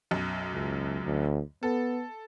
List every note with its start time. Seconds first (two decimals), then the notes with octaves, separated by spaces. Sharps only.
0.11 B1 F#2
0.53 C#2
1.05 D2
1.63 B3 A4